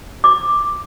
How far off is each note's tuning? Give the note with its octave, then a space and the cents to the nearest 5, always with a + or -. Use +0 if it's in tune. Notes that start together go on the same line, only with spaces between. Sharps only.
D6 +5